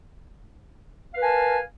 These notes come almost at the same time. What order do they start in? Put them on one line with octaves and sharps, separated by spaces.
F5 B4 A#4 G#5 A5